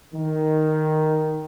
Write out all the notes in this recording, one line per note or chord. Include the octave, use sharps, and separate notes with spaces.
D#3